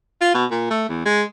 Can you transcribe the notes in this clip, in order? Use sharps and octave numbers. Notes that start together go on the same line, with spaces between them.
F4
B2
A#2
A3
E2
G#3